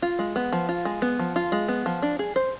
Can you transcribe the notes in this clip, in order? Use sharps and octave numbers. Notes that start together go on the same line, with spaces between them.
F4
G#3
B3
F3
F4
G#3
B3
F3
F4
G#3
B3
F3
D4
G#4
C5